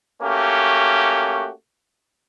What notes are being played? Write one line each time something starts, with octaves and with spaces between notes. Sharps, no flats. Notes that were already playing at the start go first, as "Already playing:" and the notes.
A3 A#3 C#4 F#4 G4